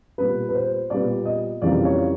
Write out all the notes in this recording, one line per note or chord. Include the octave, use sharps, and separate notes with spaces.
A#2 G3 B3 B4
B4
C5
A#2 G3 B3 D5
D#5
F2 C#3 E3 G3 A#3 D5
C#5